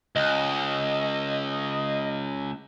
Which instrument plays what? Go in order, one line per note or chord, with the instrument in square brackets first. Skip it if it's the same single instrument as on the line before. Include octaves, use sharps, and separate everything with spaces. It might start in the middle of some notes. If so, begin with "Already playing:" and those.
[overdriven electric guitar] C#2 [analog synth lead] D#5